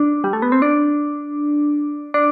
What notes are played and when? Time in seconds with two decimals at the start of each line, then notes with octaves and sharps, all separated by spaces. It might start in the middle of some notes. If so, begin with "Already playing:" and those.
Already playing: D4
0.24 G3
0.33 A3
0.42 B3
0.52 C4
0.62 D4
2.14 D4